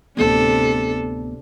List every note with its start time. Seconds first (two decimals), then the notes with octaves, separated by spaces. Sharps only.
0.17 D1 C3 B3 D4 A4